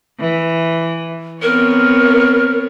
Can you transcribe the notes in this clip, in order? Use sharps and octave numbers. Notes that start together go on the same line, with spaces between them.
E3
B3 C4 A#4 C#5